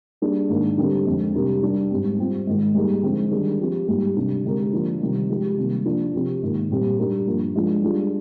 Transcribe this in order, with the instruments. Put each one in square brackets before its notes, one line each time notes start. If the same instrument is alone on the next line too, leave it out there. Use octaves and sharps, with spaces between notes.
[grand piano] G3 A#3 D4 G#4
G#2 D#3 A#3 D4
D3 G3 C4 D#4 G4
F2 D3 G#3
C3 G3 D4 G4 A#4
G3 D4 G4
G#2 G3 C4
G3 C4 F4
G#2 D#3 G#3
G3 A#3 D#4 G#4
D3 F3 G#3 C4 D#4
D#3 G3 D4 G#4
F3 C4 G4
G#2 G3 A#3 D#4 G4
C3 G3 D4
D3 G#3 C4 G4 A#4
D3 F3 A#3 D4
C3 D#3 G3 C4 D#4
F3 G#3 D#4 G4
C3 D#3 G3 A#3
F3 A#3 D4 F4
C3 F3 C4 G4
G#2 D#3 A#3
A#2 G3 C4 G4
G3 D4 G4 A#4
G2 F3 A#3 F4
F3 G#3 D4 F4
G3 D4 F4 G#4